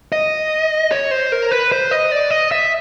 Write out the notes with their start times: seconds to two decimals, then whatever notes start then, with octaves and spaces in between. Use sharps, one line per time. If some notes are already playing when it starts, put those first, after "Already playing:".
0.12 D#5
0.92 C#5
1.11 C5
1.32 A#4
1.51 B4
1.72 C5
1.91 D#5
2.12 D5
2.31 D#5
2.52 E5